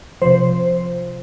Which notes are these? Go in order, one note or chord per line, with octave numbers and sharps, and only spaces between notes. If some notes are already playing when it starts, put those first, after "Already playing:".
C3 F3 C5